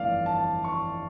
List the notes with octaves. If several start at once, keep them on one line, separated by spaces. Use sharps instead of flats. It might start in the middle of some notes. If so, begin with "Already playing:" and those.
Already playing: G1 F2 E3 A3 D5 F5
A5
C#6